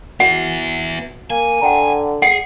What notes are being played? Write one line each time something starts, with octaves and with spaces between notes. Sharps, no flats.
B3 E4 F#4 F#5 D7
A#3 G#5
D3 F#5 G5 A#5
G#4 F#5 C#7 D7